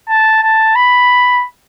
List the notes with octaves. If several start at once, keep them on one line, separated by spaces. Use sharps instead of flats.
A5
A5
B5